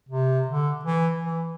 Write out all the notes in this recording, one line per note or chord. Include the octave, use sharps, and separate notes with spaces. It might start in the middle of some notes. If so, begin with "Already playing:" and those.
C3
D3
E3
E3